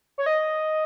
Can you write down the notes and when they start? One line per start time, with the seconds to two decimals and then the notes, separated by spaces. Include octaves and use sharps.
0.18 C#5
0.26 D#5